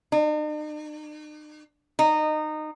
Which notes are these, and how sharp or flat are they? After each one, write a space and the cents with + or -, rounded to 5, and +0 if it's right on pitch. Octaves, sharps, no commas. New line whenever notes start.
D#4 -45
D#4 -20